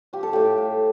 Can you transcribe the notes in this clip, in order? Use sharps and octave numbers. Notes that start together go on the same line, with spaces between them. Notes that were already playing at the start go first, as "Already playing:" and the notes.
F3 G4
A4
A2 G4
A2